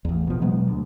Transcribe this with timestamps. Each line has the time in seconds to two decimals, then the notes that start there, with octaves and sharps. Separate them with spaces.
0.05 A1 E2
0.27 B2 F3
0.41 B2 F#3 G#3 B3
0.68 D2